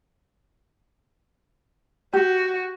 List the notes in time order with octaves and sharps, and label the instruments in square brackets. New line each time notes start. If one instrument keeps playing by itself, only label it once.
[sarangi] F#4 [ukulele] G4